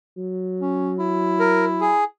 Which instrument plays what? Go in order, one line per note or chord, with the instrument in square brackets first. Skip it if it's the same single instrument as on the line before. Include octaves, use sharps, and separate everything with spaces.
[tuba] F#3
[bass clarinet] C#4
E4
[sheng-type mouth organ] A#4
G#4